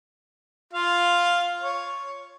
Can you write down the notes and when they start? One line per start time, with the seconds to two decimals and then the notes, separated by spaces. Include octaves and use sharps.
0.73 F4 F5
1.61 C#5